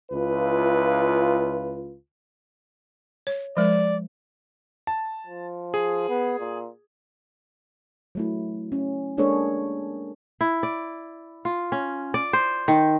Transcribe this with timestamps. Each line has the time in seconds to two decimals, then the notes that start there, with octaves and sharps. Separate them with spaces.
0.12 C#2 E4 F4 B4
3.27 C#5
3.57 F3 G#3 A#4 D5
4.87 A5
5.27 F3
5.74 G#4
6.09 B3
6.39 A#2
8.15 F#3 A3 E4
8.72 C#4
9.17 G#3 A#3 D4 G#4 A4 C#5
10.41 E4
10.63 D5
11.45 F4
11.72 C#4
12.14 D5
12.33 C5
12.68 D#3